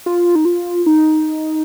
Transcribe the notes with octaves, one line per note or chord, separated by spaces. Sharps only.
F4
D#4
F4
D#4